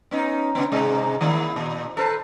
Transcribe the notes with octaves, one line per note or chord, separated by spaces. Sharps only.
B3 C#4 D#4
C#3 B3
G#2 C3 G#3
D#3 A#3 E4
A#2
A4 B4 C5